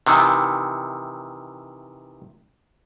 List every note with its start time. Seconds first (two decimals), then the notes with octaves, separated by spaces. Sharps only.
0.07 C3 D#3 E3